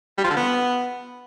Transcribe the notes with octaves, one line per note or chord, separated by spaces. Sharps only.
G3
F3
D3
B3